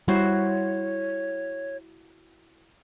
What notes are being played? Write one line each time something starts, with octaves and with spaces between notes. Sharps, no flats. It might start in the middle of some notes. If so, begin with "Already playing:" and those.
G3 E4 F#4 C5 C#5